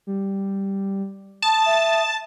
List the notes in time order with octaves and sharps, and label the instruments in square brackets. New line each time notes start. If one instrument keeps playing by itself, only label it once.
[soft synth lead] G3
[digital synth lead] A5 [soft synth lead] D#6
[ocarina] E5